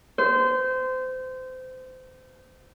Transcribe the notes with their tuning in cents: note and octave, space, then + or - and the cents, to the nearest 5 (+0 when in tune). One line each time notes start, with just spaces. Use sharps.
C5 -25